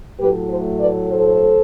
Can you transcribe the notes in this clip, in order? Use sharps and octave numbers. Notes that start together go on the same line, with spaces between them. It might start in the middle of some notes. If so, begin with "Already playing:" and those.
A2 F#3 A3 G4 B4
A4 C5
B4 D5
A4 C5